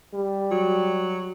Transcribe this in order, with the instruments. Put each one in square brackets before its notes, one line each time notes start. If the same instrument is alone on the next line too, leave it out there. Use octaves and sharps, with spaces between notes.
[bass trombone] G3
[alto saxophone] F#3